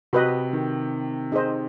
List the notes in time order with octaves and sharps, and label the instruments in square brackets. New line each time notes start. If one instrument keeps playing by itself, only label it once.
[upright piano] C3 [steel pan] F#4 B4 D#5
[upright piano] D#3
[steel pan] D#4 G#4 C5 D#5